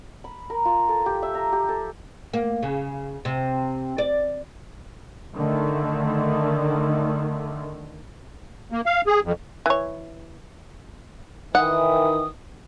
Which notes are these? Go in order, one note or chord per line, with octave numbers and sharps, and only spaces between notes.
B5
A#4
F4
A4
G4
E5
A#5
G4
A4
A#3
C#3
C3
D5
D3 D#3 A3
A#3
F5
G#4
F2
E3 C#5
D#3 E3 F#5 D#6